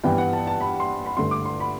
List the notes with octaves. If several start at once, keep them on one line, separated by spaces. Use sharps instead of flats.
G2 E3 B3 G5
F#5
A5
A5
B5
C6
B5
G2 D3 A3 C6
D6
C6
B5